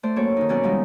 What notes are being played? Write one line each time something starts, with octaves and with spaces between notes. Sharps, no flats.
A3 C5 D5
F#2 A#3 A4 C#5 D6
D#3 D#4
B2 F#3 C#4 A#4 D5 F#5
D#3 F3 G3 G#3 B3 D#4